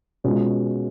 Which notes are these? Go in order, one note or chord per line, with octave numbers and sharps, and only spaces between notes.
B2 G#3 C#4 F4